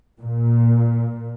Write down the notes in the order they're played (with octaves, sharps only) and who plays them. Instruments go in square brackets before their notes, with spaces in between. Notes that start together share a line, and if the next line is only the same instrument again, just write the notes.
[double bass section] A#2